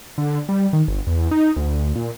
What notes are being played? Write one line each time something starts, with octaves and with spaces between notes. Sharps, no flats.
D3
G3
D#3
G1
E2
D#4
D2
A#2